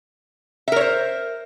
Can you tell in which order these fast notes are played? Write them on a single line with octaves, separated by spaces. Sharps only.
E5 A#4 C#5 C5